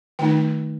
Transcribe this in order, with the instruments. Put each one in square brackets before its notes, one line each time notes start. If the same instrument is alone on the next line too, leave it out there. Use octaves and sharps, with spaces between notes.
[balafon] D#3 A3 D#4 G5